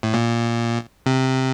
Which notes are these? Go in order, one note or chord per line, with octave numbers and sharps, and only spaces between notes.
A2
A#2
C3